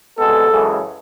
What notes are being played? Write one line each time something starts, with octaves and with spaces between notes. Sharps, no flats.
C2 B2 G#3 B3 A4
F#2 C#3 E3 G#3